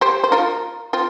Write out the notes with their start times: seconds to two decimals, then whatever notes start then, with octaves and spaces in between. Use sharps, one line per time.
0.01 G4 C5
0.24 C5
0.32 F4 A#4
0.93 C4 F4